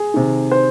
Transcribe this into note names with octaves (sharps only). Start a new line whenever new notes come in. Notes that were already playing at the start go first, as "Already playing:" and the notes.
Already playing: G#4
C3 D#3
C5